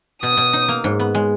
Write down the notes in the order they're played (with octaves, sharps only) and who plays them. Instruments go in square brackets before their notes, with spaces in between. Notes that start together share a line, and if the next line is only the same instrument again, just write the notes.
[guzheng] B2 [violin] D#6
[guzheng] B2
D#4
A#3
G#2
B3
G#3